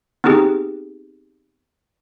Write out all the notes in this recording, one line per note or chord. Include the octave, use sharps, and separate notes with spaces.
B3 C4 D#4 G4 G#4